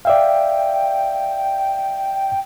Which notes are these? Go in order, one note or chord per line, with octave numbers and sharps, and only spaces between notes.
D5 E5 F5 G5